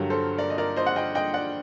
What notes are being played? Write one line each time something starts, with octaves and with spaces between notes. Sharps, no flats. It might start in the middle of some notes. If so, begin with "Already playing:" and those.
Already playing: G2 D3 F#3 G4 A#4
A4 C5
A#4 D5
D#5
A#4 D5
C5 D#5
F#5
D#5 G5
D#5 G5
D5 F#5